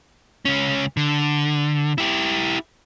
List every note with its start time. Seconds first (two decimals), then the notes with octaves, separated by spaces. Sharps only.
0.45 C#2 C#4
0.97 D3
1.98 E4 G4